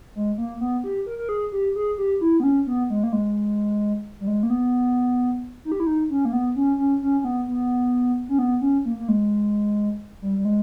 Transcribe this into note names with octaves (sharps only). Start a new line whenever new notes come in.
G#3
A#3
B3
G4
A#4
A#4
G#4
G4
G#4
G4
E4
B3
C#4
B3
G#3
A#3
G#3
G3
G#3
A#3
B3
D#4
G4
E4
D#4
C#4
A#3
B3
C#4
C#4
C#4
C#4
B3
B3
C#4
B3
C#4
A#3
A#3
G#3
G3
G3
G#3